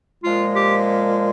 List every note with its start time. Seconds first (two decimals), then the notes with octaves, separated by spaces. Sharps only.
0.24 A#2 F3 G#3 F4
0.56 G4